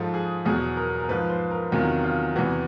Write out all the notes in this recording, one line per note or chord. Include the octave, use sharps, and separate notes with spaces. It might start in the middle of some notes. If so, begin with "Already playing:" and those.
Already playing: G#2 F3 A4
G#4
E2 B2 F#3 G#4
A#4
A#4
G#2 F3 B4
C5
A#4
E2 C3 D#3 F#3 F4
F4
E2 C3 E3 F#4